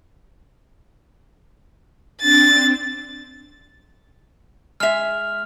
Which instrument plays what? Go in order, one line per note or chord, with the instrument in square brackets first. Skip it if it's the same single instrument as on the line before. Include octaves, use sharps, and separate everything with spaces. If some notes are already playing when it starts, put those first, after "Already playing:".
[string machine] C4 D4 [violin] A6
[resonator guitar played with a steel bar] G#3 E5 [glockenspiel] F6 F7